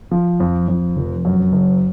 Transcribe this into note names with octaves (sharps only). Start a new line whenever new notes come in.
F3
F2
F2
F1
F#2
F#1